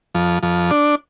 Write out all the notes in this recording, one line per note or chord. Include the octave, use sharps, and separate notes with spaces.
F2
F2
D4